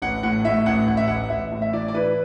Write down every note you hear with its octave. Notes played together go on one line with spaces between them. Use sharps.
A1 F#5
A2 F#5
A2 E5
A1 F#5
A1 F#5
E5
A1 F#5
A1 E5
A2
E5
E3 D5
D5
E3 B4